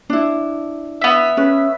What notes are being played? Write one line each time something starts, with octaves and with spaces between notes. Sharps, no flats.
D4 E4
B3 E5
C#4 B4